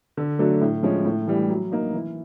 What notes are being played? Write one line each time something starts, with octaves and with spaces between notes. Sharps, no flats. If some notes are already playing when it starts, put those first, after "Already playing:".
D3
F#3 A3 D4
A2
F3 G#3 C#4
A2
E3 G3
F#3
A#3 D#4
E3